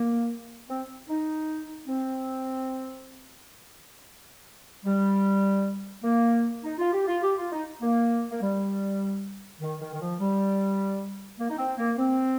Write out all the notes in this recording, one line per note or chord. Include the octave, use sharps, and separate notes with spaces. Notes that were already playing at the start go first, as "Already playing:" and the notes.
Already playing: A#3
C4
D#4
C4
G3
A#3
D#4
F4
G4
F4
G4
F4
D#4
A#3
A#3
G3
D#3
D#3
D#3
F3
G3
A#3
D#4
C4
A#3
C4